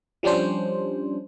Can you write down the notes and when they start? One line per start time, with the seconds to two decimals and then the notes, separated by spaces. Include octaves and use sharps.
0.23 F3 G3 C#4 D4 C5